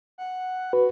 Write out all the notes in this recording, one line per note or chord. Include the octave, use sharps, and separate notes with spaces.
F#5
F#4 B4